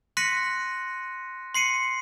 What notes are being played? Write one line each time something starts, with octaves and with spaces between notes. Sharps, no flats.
C6 F#6 A#6 B6 C#7 D#7
C6 C7 C#7 D#7